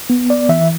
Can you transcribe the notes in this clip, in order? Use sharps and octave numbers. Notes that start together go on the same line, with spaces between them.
B3
D5
E3 E5